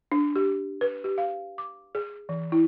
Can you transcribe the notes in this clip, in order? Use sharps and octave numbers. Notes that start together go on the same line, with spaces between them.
D4
G4
B4
G4
F5
D6
G#4
E3
E4